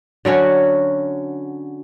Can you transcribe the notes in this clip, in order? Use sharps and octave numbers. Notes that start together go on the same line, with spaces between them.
D3 F#3 C#4 F#4